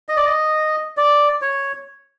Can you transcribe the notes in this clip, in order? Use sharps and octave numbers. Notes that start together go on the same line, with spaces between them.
D#5
D5
D#5
D5
C#5